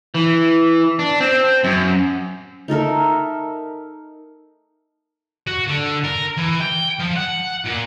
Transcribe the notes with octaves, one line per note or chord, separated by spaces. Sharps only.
E3
D4
C4
F#2
D#4 A4 A#4 E5
F#4
D3
A#4
E3
G5
F3
F#5
A#2